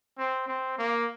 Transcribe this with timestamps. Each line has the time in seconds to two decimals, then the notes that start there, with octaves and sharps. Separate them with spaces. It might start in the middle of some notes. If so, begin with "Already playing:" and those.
0.18 C4
0.48 C4
0.78 A#3